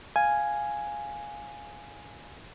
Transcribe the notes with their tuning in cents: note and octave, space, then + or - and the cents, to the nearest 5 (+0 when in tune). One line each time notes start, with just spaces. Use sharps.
F5 +0 G#5 +0